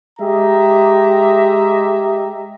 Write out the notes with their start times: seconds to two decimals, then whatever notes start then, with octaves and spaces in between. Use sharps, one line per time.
0.20 G#3 G4 D#5 E5 A#5